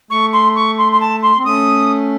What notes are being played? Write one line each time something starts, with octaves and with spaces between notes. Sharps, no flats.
A3 C#6
C6
C#6
C6
C6
A5
C6
C4
A3 C#4 D#6